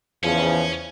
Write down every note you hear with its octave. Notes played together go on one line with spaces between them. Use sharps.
E2 C#3 F3 C#4